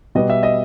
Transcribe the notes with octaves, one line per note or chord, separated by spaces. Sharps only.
B2 G3 B3 D#5
E5
D#5